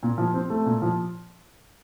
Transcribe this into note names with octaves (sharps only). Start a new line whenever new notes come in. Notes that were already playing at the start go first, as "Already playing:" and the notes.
A#2
F3
C4
A3
A#2
F3